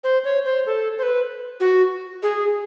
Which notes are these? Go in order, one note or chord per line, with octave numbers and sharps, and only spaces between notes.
C5
C#5
C5
A4
C5
B4
F#4
G#4